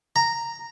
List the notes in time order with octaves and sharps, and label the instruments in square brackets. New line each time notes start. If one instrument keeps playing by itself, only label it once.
[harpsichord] A#5